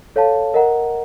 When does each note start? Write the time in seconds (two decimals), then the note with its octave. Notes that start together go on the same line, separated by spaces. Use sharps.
0.16 A4 C#5 F5 A5
0.54 A#4 D#5 F#5 A#5